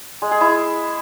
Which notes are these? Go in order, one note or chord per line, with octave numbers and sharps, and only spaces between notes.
G#3
G#4
E4